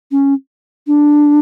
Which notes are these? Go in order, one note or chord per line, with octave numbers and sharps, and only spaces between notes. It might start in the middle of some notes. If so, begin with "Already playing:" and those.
C#4
D4